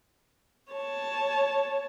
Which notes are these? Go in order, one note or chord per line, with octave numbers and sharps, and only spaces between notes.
C#5 A5